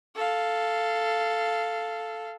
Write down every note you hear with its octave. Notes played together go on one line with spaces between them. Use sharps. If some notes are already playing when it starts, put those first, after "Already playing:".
A4 F5